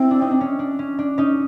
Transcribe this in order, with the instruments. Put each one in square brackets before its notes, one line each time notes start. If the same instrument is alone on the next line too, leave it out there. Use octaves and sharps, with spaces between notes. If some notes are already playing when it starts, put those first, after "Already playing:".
Already playing: [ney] C4 [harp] E4
[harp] D4
D#4
D4
C#4
D4
C#4
D4
C#4 D#4